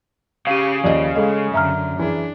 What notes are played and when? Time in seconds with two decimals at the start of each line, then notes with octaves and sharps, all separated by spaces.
0.47 C#3 G4 F5 D#7
0.84 D#2 F3 D5 D#5
1.15 G#3 G#4 A4 D#5 F5
1.54 F#2 D3 E5 A#5 F6
1.99 E3 D4 G#4